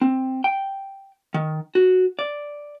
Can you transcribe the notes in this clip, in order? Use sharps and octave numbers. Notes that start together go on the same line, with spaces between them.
C4
G5
D#3
F#4
D5